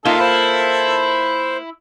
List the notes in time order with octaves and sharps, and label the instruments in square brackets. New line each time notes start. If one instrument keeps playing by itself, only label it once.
[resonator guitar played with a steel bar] A#3 F4 [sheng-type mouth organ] D#4 [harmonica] A4 [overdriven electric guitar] E5 G5
[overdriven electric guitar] E4 [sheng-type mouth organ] C5